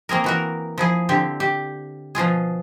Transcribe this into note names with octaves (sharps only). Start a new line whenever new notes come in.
A#3 C4 G#4 A#4
E3 F#4 A#4
F3 E4 G#4
D3 C4 G4
G4
B2 F3 F4 G#4